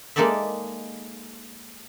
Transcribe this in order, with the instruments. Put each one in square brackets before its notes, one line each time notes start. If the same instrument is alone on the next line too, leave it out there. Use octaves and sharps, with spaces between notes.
[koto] G#3 A#3 D#4 A4 D5 E5